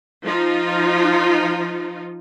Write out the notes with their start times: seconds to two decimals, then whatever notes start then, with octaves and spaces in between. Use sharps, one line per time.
0.25 F3 D#4 F4